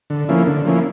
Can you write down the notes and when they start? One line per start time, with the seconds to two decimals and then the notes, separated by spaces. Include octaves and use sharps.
0.10 D3
0.29 F3 A#3 C#4 E4
0.47 D3
0.65 F3 A#3 C#4 E4